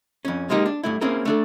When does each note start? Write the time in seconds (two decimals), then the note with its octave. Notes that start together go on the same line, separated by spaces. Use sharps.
0.25 F2 C#4
0.50 G#3 A#3 D#4 G4
0.66 D4
0.83 G2 A3 E4
1.01 A#3 C4 C#4 E4 G#4 A#4
1.25 A3 D4 A4